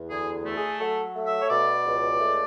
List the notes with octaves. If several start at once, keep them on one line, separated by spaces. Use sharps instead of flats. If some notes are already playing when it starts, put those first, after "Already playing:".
Already playing: E2
D2 G#4
A3
G#4
F#3 A4
A3
E5
C#5
B2 D5
C#2
A3